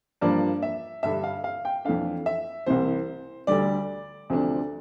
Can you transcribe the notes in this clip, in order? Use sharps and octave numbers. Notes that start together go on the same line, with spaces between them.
G2 F3 A#3 D4 D5
E5
G2 D3 G3 E5
F5
F5
G5
F2 E3 A3 D4 F5
E5
C2 C3 E3 C5
D2 D3 G3 D5
D2 C3 F3 A3 D4